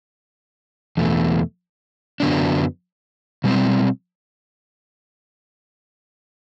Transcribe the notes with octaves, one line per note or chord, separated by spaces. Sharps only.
E2 B2 A3
F#2 D3 F#3 B3 D4
B2 G3 C4